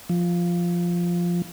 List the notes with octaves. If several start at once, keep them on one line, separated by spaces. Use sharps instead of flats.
F3